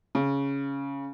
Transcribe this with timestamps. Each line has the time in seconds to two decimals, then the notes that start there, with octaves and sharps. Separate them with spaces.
0.15 C#3